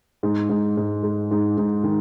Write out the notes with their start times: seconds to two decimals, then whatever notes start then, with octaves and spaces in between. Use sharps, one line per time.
0.23 G#2
0.49 G#2
0.77 G#2
1.03 G#3
1.31 G#2
1.58 G#2
1.84 D#3